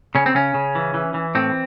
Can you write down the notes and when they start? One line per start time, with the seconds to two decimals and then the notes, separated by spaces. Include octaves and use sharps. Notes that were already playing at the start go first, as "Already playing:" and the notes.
0.15 C#3 C#4
0.26 C4
0.34 C#3 C#4
0.54 C#3
0.75 E3
0.94 E3
1.14 E3
1.35 A2 C4